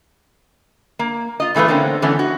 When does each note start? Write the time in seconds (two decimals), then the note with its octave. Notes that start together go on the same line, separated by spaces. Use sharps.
0.99 A#3
1.40 F4 D#5
1.55 A#2 E3 A3 F4 B4
1.68 D3 A3 A#3 C4 C#4 C5
2.02 D3 E3 A3 B3 C#4
2.19 F#4